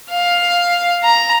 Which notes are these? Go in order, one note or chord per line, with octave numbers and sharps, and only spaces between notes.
F5
A#5